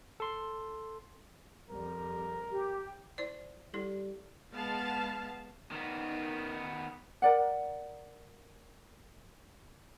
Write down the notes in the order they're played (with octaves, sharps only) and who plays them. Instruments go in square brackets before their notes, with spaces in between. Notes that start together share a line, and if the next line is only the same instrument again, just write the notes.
[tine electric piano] A4 C6
[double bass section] F2 G3 C4 [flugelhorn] A#4
[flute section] G4
[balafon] E4 C5 D5
[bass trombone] G3 [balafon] E4 A4
[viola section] G#3 B3 F5 A5
[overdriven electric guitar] D#3 B3
[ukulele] A#4 D5 F#5